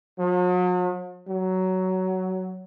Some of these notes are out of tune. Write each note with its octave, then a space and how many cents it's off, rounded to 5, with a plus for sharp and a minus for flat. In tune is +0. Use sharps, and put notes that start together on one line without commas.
F#3 -45
F#3 +15